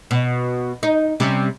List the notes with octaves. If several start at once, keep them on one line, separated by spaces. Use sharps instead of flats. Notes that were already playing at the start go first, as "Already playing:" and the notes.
B2
D#4
C3 G3 C#4